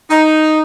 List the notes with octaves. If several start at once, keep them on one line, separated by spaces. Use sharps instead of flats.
D#4